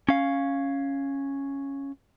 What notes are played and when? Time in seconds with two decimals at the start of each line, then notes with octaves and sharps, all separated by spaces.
0.09 C#4 F5